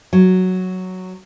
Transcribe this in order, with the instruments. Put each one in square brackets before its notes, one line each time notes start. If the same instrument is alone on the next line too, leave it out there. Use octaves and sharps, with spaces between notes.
[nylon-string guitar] F#3